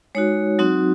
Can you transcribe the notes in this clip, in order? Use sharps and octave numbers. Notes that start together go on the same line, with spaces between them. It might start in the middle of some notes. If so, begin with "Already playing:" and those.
G#3 D#4 F#4 C#5
F#3 C4 D#4 F#4